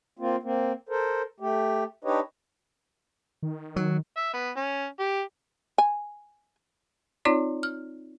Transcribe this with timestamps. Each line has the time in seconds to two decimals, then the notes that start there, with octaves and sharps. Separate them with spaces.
0.19 A#3 C4 F4
0.43 A#3 C4
0.89 A4 A#4 C5
1.40 A3 G4
2.04 D4 D#4 G4 B4 C#5 D#5
3.43 D#3
3.76 F#3
4.17 E5
4.34 B3
4.57 C#4
5.00 G4
5.78 G#5
7.25 C4 D#4 F4 C#5 D5
7.63 F6